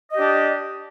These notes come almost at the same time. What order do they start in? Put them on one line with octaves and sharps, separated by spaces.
D#5 G4 D4